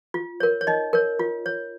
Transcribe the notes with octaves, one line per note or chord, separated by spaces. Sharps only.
F4
A#4 C#5
C#5
D#4 D#5
A#4 C#5
F4
C#5